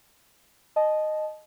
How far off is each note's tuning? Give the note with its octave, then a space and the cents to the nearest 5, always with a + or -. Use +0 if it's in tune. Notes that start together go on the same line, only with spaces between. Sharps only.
D#5 -10 A5 -25